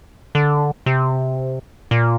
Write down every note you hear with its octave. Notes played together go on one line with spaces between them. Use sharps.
D3
C3
A#2